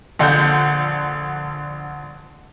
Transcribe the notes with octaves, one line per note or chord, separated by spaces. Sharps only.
A#1 D3 F#5 G6